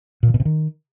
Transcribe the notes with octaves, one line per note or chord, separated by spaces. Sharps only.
A#2
D#3
B2
C3
D#3